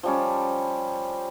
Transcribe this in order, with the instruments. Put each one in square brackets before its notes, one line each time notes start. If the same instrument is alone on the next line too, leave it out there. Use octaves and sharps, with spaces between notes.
[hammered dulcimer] F3 G3 C#4